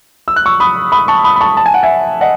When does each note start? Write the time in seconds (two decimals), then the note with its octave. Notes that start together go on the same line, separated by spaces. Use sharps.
0.28 E6
0.36 F#6
0.46 C#6 E6
0.60 B5 D#6
0.92 B5 D#6
1.08 A5 C#6
1.24 B5 D#6
1.36 B5
1.41 A5 C#6
1.57 A5
1.66 G#5
1.74 F#5
1.83 E5 G#5
2.21 D#5 F#5